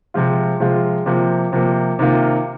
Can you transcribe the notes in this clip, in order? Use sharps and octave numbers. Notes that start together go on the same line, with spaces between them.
C3 F3 G#3 F4
C3 F3 G#3 F4
C3 F3 A#3
C3 F3 A#3
C3 D#3 A#3 F4